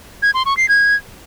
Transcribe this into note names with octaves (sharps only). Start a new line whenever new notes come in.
G#6
C6
C#6
C7
G#6